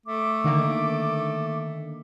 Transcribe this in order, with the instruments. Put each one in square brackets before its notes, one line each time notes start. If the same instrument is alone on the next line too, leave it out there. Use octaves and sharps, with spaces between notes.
[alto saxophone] A3 [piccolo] D6
[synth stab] D3 D#3 A#3